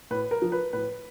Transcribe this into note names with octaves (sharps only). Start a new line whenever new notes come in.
A2 B4
A#4
F3
B4
A2 B4